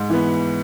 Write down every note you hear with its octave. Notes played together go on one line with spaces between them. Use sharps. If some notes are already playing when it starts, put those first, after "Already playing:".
Already playing: G#2
E3 B3